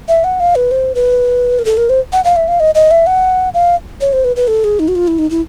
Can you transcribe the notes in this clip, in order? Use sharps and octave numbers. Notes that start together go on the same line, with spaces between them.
E5
F#5
F5
B4
C5
B4
A#4
A4
A#4
C5
F#5
F5
E5
F5
D#5
D#5
E5
F#5
F5
C#5
C5
B4
B4
A4
G#4
D#4
F#4
F4
E4
D#4
E4